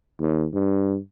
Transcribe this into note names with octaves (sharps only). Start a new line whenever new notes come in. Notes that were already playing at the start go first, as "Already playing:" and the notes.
D#2
G2